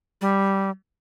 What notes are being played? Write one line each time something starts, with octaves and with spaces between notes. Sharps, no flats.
G3